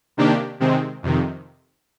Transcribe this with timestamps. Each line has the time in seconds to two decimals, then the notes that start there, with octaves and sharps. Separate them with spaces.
0.17 C3 D#3 A#3 D4 G4
0.60 C3 D#3 G#3 C4
1.03 F2 C3 D#3